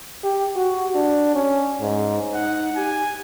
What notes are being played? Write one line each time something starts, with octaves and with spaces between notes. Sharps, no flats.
G4
F#4
D4
C#4
G#2
D#4 F#5
G4 G#5